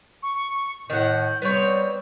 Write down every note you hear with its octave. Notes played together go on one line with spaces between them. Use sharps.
C#6
A2 D#3 F#5 G6
G3 B3 C4 C#5